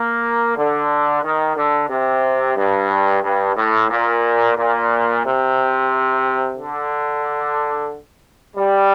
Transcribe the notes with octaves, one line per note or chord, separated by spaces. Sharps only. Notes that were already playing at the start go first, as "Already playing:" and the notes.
Already playing: A#3
D3
D#3
D3
C3
G2
G2
A2
A#2
A#2
C3
D3
G3